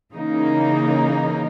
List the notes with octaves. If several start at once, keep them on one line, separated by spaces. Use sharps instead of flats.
C#3 E3 A#3 D#4